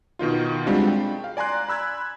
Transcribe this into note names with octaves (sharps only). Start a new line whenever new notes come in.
B2 D#3 D#4 F4
G3 G#3 C4 D4 F4 F#4
G5
F5
D5 G#5 A#5 C6 F#6
B5 E6 F#6 G#6